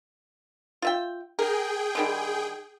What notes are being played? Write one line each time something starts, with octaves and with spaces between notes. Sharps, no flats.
F4 E5 G5
G#4 A#4 G5
D3 D#3 G3